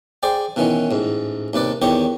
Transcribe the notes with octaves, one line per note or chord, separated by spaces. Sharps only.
G#4 C5 D5 G5
B2 D#3 E3 C#4
A1 G#2
D#2 C3 B4 D5
E2 D#3 G4 C#5 D#5 D#6